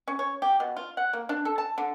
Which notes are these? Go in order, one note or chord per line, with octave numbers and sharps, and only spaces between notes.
C#4
C#5
G4
B2
F4
F#5
A#3
D4
A4
A5
D3